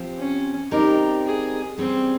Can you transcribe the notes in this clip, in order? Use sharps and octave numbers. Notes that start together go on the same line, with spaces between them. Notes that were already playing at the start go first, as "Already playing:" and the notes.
Already playing: F3 C4 G4 C5
C#4
G3 C4 D#4 G4 A#4
G#4
G3 C4 C#4 G#4 C5